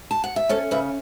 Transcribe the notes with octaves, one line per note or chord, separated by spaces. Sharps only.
A5
F#5
E5
C#4 A4 C#5
C#3 B4 E5